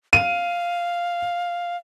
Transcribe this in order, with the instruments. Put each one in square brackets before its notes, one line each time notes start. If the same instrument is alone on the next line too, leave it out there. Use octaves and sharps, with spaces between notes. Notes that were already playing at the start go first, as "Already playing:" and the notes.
[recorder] F5 [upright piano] D#7